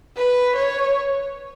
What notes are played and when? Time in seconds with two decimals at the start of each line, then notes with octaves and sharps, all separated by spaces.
0.16 B4
0.56 C#5